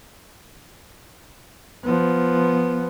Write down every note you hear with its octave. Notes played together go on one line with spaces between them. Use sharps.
F3 B3